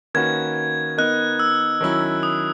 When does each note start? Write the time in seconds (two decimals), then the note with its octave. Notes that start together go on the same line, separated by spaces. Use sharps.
0.14 D#3 A#3 C#4 F#4 B4 G#6
0.98 B3 D#4 A#4 D#5 F#6
1.40 E6
1.81 D#3 F#3 C#4 E4
2.23 D#6